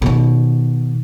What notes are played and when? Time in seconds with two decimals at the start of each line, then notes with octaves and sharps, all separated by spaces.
0.02 B2 D#3